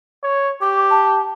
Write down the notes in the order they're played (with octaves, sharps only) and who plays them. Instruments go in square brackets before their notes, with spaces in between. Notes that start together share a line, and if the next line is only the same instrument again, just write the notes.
[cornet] C#5
[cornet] G4 [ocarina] D6
[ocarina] A5